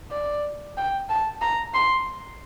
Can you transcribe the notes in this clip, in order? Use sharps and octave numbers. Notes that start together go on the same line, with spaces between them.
D5
G5
A5
A#5
C6